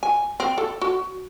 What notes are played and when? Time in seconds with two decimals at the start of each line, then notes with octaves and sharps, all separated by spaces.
0.03 G#5
0.40 C4
0.58 A4
0.81 F#4